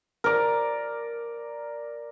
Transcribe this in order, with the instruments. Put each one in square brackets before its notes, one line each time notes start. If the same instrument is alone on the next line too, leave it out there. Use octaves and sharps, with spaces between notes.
[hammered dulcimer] A#4 D5